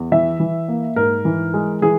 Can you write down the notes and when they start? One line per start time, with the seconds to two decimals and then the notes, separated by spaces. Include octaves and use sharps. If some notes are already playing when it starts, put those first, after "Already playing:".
Already playing: E2
0.12 E3 E5
0.40 E3
0.68 A#3
0.96 G#2 A#4
1.25 E3
1.54 G#3
1.82 E3 G#4